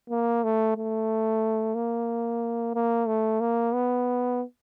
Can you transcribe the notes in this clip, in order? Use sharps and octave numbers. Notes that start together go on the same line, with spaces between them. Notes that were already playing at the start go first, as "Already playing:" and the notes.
A#3
A3
A3
A#3
A#3
A3
A#3
B3